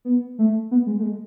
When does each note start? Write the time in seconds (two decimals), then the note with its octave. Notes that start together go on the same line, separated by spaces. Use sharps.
0.05 B3
0.39 A3
0.71 B3
0.86 G#3
0.99 A3
1.03 G#3